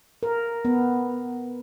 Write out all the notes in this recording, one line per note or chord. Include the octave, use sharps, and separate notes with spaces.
A#4
B3